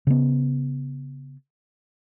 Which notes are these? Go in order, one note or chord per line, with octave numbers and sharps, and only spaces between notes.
C#3 B3